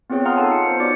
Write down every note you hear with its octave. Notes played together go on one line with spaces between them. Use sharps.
B3 C4 F4 G#4 C#5
F5 F#5 A#5 C6 D#6 F6
D#4 F4 A4 F5 G#5 A5
C#7
B3 C5
D#4 F#4 C#5 D5 D6 C#7